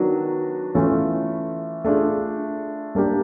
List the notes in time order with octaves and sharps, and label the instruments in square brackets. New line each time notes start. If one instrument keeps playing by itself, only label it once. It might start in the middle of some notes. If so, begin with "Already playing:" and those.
Already playing: [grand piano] D#3 F#3 B3 D4 F#4
E3 A3 C#4 F4
A3 D4 F4 G#4
G3 A#3 D4 G4 A#4